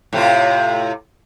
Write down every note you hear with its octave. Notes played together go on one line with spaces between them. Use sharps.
A2 C3 F4